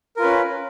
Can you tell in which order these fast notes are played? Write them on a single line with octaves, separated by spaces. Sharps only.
A#4 F4 B4 C#4